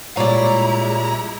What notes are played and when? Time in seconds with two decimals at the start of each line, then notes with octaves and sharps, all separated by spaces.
0.17 A#2 G3 G#3 E4 C#5 D5 A#5